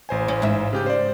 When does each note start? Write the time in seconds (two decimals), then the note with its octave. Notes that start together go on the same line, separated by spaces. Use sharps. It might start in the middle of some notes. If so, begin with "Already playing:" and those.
0.09 A1 C5 G#5
0.28 C#4
0.42 G#2 E5
0.73 C#3 G4 G6
0.86 C5 D5